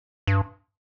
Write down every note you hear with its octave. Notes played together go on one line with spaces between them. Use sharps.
G2